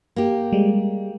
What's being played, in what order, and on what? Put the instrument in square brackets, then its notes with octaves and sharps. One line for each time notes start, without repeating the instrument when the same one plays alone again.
[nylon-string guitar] A#3 G4
[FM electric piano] G3 G#3